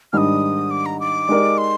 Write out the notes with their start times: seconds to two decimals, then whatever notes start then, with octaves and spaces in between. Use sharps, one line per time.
0.13 G#2 D#3 G3 D4 D#6 F6
0.71 D6
0.86 A#5
1.00 D6
1.29 G#3 D#4 G4 A#4 D5
1.58 C6